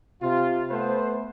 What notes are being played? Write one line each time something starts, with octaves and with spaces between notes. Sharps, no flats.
C3 F4
A3 B3 B4 C5